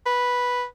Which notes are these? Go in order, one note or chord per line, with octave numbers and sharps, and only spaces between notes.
B4